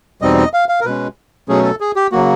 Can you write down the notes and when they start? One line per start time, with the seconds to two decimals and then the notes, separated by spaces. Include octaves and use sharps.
0.22 E2 B2 G3 C4 D#4 D#5
0.38 D#5
0.54 F5
0.69 F5
0.81 A#4
0.85 B2 G#3 C#4 B4
1.48 B2 F#3 A3 C#4 G#4
1.64 A4
1.80 G#4
1.96 G4
2.12 C#3 F#3 A#3 F#4